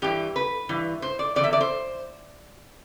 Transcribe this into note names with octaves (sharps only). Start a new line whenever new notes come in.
G2 E3 G4
B4
G2 E3
C5
D5
E2 D3 D5
E5
D5
C5